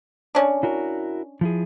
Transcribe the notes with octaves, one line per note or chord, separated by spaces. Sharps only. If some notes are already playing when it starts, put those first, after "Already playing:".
C#4 D4
E4 F#4 A#4
F3 E4 G#4